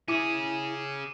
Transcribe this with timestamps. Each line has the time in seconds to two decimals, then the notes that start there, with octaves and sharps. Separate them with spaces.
0.08 C#4 E4 G#4 D6 D#7